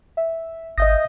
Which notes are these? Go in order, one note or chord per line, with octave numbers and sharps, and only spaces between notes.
E5
G#1 D#5 E5 D#6 G6 A#6